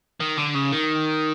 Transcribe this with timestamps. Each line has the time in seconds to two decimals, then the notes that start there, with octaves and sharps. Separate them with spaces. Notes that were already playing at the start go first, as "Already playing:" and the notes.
0.20 D#3
0.38 D3
0.55 C#3
0.72 D#3